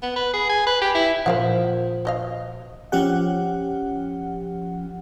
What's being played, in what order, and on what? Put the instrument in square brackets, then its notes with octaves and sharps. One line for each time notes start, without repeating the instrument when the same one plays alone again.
[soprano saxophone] B3
B4
G#4
G#5
B4
G4
E4
[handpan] A#2 F3 C5 [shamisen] A#4 F5 F#5
[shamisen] F#4 D#5 F5
[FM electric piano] F3 C#4 G4 F#5